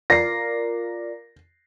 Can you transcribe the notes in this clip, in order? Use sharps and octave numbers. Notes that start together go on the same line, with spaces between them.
F4 A#4 D5 A#6 C7